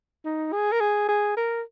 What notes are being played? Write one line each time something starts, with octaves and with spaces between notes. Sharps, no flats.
D#4
G#4
A#4
G#4
G#4
A#4